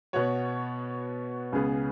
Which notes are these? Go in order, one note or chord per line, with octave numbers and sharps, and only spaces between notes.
B2 B3 F#4 C#5
C#2 C#3 B3 G#4 B4